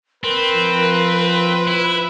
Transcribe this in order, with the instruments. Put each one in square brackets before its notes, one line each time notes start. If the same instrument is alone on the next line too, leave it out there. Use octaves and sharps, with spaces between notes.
[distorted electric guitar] C4 [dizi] A#4 [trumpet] B4
[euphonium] F3
[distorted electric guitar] E4